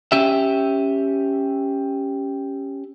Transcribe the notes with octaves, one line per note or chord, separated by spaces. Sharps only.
C#4 G4 E5